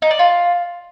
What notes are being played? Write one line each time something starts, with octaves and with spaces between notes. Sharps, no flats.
D#4
D5
F4